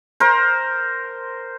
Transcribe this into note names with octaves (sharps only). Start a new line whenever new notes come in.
A#4 C5